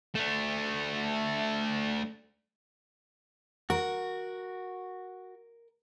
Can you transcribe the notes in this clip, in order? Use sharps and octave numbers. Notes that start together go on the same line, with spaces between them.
A3 D4
F#4 A#4